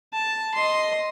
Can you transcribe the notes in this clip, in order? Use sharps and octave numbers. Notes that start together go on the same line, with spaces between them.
A5
D#5 C6